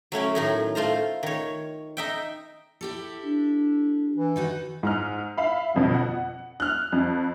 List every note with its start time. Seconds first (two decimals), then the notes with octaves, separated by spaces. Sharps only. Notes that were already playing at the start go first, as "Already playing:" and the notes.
0.12 F#3 A3 C#4 E4
0.35 A2 D#3 D#4
0.75 A3 F4 C5 A#5
1.23 D#3 C#5
1.97 D#4 E5 G5
2.81 E4 G4 A4
3.23 D4
4.16 E3
4.36 D#3 D#4 F#4
4.83 G#2 A#5 F6
5.38 E5 F5 B5
5.75 G1 F2 B2
5.95 F#5
6.60 F6 F#6
6.92 F2